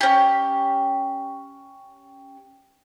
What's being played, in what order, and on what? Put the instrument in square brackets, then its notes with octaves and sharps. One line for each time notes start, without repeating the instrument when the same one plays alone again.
[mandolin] C#4 G4